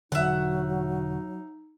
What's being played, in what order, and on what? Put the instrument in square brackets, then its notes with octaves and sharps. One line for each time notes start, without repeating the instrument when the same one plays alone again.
[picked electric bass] E1 D3 [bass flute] F#3 [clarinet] D#4 [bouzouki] E5 F#5